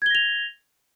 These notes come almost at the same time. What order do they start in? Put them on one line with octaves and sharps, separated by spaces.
G#6 G7 A#6 F7